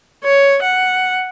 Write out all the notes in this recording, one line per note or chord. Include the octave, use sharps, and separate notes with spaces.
C#5
F#5